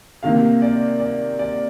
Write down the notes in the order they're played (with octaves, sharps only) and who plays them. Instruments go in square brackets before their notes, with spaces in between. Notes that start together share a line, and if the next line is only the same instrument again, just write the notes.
[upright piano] C3 D#3 A#3 [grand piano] F5
[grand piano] D5
D5
D5